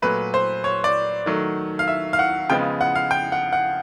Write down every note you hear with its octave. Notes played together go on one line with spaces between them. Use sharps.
A#2 F#3 A3 B4
C5
C#5
D5
D#3 F#3 A3
F5
E5
F5
F#5
C#3 F3 G#3 B3 G5
F#5
F5
G5
F#5
F#5